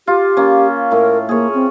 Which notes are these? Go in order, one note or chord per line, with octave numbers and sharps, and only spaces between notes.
F4 G4
A#3 C#4
A2 A#4
A#3 G#4 C#5
C4